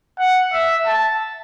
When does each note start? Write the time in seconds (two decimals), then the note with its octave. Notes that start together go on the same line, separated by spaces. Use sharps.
0.19 F#5
0.53 E5
0.87 A5